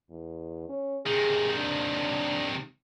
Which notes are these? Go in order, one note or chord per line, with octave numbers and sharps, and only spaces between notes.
E2
C#4
C3 D#3 G#4
D4